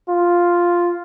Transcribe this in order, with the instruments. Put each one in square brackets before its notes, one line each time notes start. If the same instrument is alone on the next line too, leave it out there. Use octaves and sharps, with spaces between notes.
[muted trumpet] F4